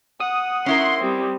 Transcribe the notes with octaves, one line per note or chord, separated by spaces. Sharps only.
F#5 D#6
C#4 E4 A#4 C6
G3 C4